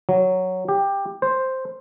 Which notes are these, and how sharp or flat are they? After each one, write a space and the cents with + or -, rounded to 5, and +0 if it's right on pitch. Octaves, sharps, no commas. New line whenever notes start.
F#3 +0
G4 +15
C5 +0